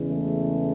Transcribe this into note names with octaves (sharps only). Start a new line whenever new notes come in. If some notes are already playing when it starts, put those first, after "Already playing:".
Already playing: E2 C#3 E3 G#3
A3